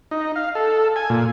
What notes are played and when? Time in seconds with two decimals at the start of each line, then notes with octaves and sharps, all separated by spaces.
0.11 D#4
0.36 F5
0.55 A4
0.96 G#5
1.10 A#2